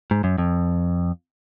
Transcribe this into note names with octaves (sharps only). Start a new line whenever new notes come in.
G#2
F#2
F2